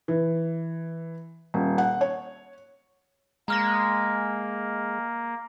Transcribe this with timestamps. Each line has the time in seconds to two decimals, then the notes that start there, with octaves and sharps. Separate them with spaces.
0.08 E3
1.54 D#1
1.78 F#5
2.01 C#5
3.48 G#3 A#3 A#5 F6 A#6